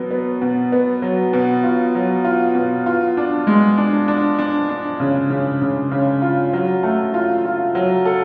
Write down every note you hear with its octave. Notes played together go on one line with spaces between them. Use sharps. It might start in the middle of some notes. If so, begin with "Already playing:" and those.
Already playing: B2 F#3 B3
B3
B2
B3
F#3
B2
F4
F#3
F4
B2
F4
D4
G#3
D4
D4
D4
D4
C#3
C#3
C#3
C#3
F4
F#3
A3
F4
F4
F#3
A4